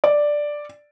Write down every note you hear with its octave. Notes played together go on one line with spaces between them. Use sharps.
D5